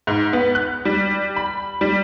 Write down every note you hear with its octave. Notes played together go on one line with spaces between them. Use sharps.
G#2
B3
F#6
G3
B5
G3